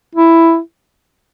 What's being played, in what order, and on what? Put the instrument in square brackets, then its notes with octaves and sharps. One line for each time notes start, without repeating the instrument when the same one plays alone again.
[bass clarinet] E4